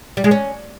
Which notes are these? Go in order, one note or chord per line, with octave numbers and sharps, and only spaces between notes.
G3
G#3
C#4